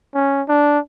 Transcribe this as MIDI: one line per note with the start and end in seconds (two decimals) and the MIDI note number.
0.15 0.42 61
0.48 0.79 62